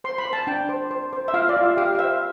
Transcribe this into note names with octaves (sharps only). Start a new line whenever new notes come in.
C5 C6
B5
C5
A5
D4 G5
C5
C5
C5
E5
F4 F5
D5
F4
E5
G4 F5
F5
C5 E5